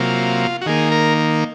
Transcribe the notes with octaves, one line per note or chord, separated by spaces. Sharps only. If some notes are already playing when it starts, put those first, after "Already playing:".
Already playing: C3 F#3 A#3 F4
F#4
D#3 A#3 G#4
A#4